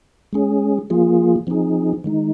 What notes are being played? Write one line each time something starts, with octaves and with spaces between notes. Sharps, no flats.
G#3 C#4 G#4
F3 A#3 F4 G#4
F3 C4 D#4 G#4
D#3 G#3 D#4